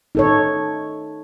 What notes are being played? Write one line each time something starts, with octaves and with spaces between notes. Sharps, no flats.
D#4 A4 C#5